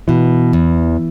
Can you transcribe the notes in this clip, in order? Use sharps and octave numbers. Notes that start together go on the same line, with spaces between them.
B2 E3
E2